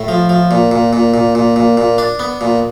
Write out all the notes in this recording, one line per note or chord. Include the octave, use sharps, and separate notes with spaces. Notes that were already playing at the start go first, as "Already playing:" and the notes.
Already playing: A2
F3
F3
A#2
A#2
A#2
A#2
A#2
A#2
A#2
D4
B3
A#2